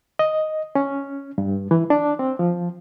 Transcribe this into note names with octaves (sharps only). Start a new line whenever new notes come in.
D#5
C#4
G2
E3
D4
C4
F3